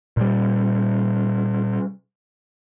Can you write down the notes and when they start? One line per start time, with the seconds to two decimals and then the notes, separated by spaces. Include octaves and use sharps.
0.17 A#2 G3